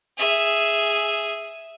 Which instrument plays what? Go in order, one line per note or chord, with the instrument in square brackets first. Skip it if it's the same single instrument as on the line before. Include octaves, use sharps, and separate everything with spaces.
[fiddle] G#4 E5